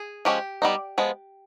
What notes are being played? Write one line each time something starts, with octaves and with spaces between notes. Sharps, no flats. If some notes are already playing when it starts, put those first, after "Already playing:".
Already playing: G#4
F3 G#3 C#4 G4
G3 B3 D#4
F3 G#3 B3